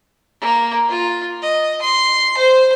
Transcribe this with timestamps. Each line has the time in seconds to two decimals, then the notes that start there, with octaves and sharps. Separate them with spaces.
0.41 A#3
0.89 F4
1.42 D#5
1.82 C6
2.38 C5